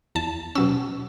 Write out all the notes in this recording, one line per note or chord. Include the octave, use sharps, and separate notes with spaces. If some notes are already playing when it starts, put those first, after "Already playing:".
E2 A5
B2 F#3 C#4 E6